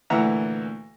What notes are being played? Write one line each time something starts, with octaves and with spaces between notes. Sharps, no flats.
D2 A#2 E3 E5 F#5 A#5